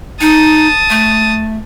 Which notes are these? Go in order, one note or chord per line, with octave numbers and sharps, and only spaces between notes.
D#4 A5 D#6
A3